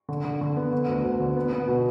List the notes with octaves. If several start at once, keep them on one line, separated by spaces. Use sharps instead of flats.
D3
D3
D3
B3
D3
D2
D2
D3
B3
B3
B2